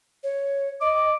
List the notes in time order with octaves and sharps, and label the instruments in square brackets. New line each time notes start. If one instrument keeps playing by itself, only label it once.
[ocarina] C#5
[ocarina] D#5 [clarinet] D6